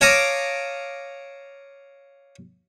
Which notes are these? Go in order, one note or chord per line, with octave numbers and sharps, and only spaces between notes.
C#5 F5 A5 A#5 D6 D#6